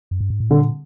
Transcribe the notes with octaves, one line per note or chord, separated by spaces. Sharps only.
F#2
G2
G#2
A2
A#2 D3